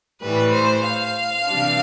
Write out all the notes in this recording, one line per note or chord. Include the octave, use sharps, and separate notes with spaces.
A2 E3 G3 B4
C5
F5
C3 E3 G3 D4